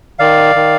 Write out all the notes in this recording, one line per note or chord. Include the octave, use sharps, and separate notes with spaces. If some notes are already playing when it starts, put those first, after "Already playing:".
D#3 D5 F5
D#3